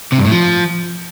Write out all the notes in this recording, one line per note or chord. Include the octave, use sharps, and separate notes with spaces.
C3
G2
A2
F3